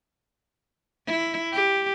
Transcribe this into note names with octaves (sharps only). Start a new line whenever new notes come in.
E4
G4